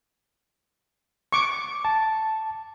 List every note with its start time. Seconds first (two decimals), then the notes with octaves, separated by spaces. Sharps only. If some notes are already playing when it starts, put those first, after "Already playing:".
1.32 C#6 D6
1.85 A5